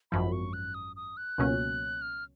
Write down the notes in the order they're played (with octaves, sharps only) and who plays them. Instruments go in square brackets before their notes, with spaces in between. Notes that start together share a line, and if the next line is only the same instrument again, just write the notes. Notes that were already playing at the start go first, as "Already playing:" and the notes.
[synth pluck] G#1 F#2 F3 [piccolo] B5
[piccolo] C#6
F#6
D#6
D#6
F#6
[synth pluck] C#2 B2 F#3 A#3 C#4
[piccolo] F6